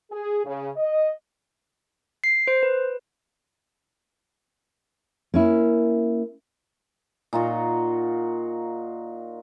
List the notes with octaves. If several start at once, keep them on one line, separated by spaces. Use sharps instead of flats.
G#4
C#3
D#5
C7
C5
B4
A#3 C#4 E4
A#2 D#4 F4 F#4